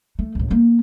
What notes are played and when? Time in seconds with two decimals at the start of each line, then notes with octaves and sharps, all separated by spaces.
0.19 A3
0.35 C#2 A2
0.50 A#3 B3